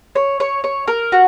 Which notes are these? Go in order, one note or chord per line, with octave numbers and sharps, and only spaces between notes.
C#5
C#5
C#5
A#4
F#4